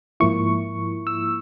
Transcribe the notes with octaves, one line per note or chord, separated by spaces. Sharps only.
G#2 F3 A#3 E4 C#6
E6